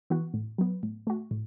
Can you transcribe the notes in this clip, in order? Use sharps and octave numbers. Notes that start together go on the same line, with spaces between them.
E3 B3 F#4
A2
F#3 B3
A2
A3 F#4
A2